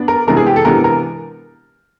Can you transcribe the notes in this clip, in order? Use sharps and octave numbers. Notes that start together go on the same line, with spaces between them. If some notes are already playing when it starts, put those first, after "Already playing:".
Already playing: B3 D4
A#4
C3 E3 G#3 B3 D4 A#4
G#4
G4
A4
C3 E3 G#3 B3 D4 A#4
A#4